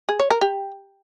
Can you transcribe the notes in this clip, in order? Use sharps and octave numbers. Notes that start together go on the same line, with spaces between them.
G#4
C#5
A#4
G4